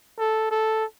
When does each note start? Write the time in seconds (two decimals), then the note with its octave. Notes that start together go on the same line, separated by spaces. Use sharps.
0.19 A4
0.51 A4